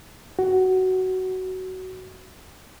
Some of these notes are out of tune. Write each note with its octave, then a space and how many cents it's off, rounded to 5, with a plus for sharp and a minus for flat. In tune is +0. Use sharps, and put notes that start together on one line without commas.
F#4 +15